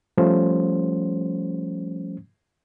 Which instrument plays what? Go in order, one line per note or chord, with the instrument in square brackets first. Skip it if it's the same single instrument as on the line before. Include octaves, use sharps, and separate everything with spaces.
[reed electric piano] F3 G3 A3 C#4 C5